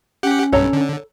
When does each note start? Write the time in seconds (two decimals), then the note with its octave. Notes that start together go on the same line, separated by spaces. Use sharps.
0.23 C#4 G4 F#5
0.52 B1 G2 A4 C#5 A#5
0.73 D3